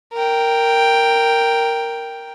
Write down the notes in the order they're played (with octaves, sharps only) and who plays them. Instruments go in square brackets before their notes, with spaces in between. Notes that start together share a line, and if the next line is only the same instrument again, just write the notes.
[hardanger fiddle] A#4 G5